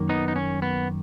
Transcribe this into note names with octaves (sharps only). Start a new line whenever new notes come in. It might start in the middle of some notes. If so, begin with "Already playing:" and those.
Already playing: F#2 D#3 A#3
B3 D#4
D#4
C#4
B3